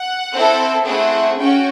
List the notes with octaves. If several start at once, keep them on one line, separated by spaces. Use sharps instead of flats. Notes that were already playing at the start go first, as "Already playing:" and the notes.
Already playing: F#5
C4 E4 A4
A3 C4 E4 G#4 F#5
C#4 F#4 G5